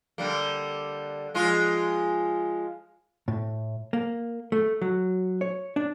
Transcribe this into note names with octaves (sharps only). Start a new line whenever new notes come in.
D3 G3 A#3
F3 G#3 F4
A2
A#3
A3
F#3
C#5
D4